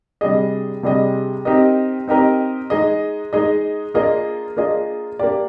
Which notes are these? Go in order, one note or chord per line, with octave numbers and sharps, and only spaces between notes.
C3 G3 D4 G#4 D#5
C3 G3 D4 G#4 D#5
C4 D#4 G4 A#4 D#5
C4 D#4 G4 A#4 D#5
G#3 D#4 G#4 D#5
G#3 D#4 G#4 D#5
A#3 D4 F4 G#4 D#5
A#3 D4 F4 G#4 D#5
A#3 D4 G4 D5